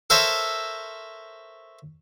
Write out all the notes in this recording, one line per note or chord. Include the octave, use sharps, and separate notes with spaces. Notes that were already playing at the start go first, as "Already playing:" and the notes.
A4 A#4 C5 C#5 E5